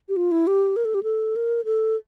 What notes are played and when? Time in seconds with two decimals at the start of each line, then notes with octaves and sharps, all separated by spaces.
0.09 G4
0.16 F4
0.31 E4
0.47 G4
0.76 A#4
0.85 A4
0.94 G4
1.03 A4
1.36 A#4
1.65 A4